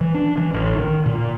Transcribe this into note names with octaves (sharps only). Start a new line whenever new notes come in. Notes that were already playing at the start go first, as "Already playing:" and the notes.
E3
D4
E3
A1
D#3
A#2